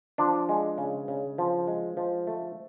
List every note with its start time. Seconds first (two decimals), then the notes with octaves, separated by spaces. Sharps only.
0.18 F3 D4
0.49 G#3
0.78 C#3
1.08 C#3
1.38 F3
1.67 G#3
1.97 F3
2.27 A3